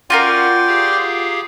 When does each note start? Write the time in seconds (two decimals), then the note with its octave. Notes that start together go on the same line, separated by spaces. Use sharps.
0.10 C#4 F4 F#4 A#4 D5 G5 C6
0.67 G4 G#4 F5